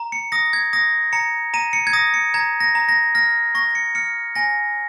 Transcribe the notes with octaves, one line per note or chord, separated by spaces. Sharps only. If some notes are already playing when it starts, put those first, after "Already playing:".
Already playing: A#5
C#7
D#6 A#6
G#6
D#6 A#6
A#5 C#7
A#5 D#7
C#7
G#6
D#6 A#6
C#7
A#5 G#6
A#6
A#5
A#6
F6 A#6
C#6 A#6
C#7
F6 C#7
G#5 A#6